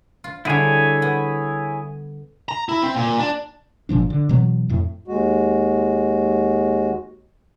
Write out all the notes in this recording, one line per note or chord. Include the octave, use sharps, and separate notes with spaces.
F4
D3 G3 E4 G#4 C#5
B3
A#5
E4
C4
A#2
D4
G1 A#2 F3 D4
D3
B2 E3 F#3 C4
F2 A2
D#2 G#3 F#4